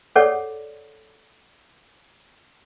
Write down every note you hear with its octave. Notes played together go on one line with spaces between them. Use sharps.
G#4 A4 C#5 D5 F#5